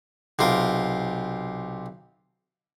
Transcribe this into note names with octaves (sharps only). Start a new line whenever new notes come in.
B1 C3 F4 A#4